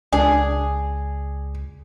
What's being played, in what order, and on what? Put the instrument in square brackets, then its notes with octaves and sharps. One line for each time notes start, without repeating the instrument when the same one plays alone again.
[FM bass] C#2 [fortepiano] D4 [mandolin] G#4